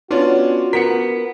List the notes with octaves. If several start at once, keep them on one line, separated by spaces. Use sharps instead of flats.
B3 C#4 D4 F4 F#4
B3 A#4 B6 C#7